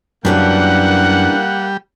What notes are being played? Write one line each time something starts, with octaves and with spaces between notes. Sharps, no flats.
F#2 C#3 E3 G3 A#3 D4 F#5